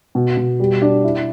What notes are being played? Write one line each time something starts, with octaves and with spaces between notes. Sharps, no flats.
B2
B2
G3
D4
E4